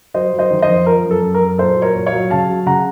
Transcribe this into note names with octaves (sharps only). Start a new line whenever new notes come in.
F#3 C5 D#5
F#3
C5 D#5
D#3
C5 D#5
F2
F3 A#4
F#2
A4
F#2
A#4
F#2
A#2 A4 C5
F#3
A#4 C#5
A#2
C#5 F5
F#3
C#3 F5 A5
F#3
C#3 F#5 A#5